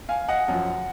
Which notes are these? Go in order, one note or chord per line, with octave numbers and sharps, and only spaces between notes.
F5 G#5
D#5 F#5
F#2 F3